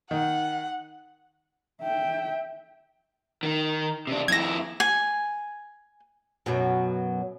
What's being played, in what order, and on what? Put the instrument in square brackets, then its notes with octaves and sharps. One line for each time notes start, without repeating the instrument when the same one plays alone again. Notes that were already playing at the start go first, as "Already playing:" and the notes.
[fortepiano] D#3 [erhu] F#5
[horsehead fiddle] E5 G5
[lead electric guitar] D#3
C3 D4
[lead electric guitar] F2 E4 [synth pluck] G#6 A#6
[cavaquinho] G#5
[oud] F#2 B2 F#3